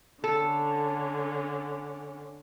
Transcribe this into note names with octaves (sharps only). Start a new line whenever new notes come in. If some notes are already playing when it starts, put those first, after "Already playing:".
D3 C#4 A4